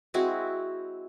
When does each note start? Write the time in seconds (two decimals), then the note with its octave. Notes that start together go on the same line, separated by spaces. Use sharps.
0.14 G#3 C4 E4 F#4